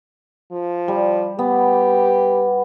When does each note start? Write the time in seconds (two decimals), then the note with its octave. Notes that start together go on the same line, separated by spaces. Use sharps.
0.52 F3
0.88 G3
1.39 B3 G4